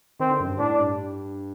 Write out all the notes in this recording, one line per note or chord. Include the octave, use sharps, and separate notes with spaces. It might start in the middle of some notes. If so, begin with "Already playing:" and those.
D#3 C4
D3
F#2
G2
A2 D4
G2